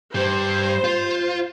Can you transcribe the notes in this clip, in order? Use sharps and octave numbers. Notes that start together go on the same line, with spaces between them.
G2 G3 C5
F4